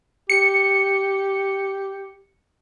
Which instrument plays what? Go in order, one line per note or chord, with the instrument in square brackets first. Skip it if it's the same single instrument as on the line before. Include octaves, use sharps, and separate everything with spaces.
[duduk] G4 [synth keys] C#7